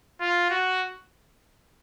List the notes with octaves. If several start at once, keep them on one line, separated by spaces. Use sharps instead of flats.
F4
F#4